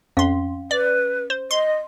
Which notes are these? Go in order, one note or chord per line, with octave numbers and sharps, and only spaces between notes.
F2 C#4 F5 C6
B4 D5
C5
D#5 C6